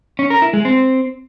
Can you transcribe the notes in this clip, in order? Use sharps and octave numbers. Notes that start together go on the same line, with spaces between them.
C#4
A#4
E4
G#3
C4